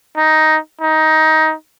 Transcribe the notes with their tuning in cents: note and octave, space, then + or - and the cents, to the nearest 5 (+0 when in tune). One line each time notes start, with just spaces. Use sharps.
D#4 +5
D#4 +15